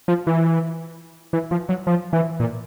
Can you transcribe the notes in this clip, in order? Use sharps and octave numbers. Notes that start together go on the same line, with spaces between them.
F3
E3
E3
F3
F#3
F3
E3
A#2